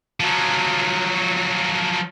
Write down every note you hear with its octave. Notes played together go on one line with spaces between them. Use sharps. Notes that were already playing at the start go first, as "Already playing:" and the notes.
F3 F#3